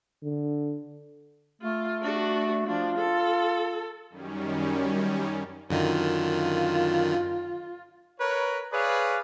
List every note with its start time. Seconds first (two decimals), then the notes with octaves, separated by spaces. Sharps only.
0.24 D3
1.62 A3 F4
2.01 D4 F#4
2.67 F3 D4 F4
2.98 A4
4.10 F#2 D#3 G3 C#4
5.70 F#2 D3 D#3 F4
8.20 A#4 B4 C#5
8.73 G#4 B4 C#5 D5 F5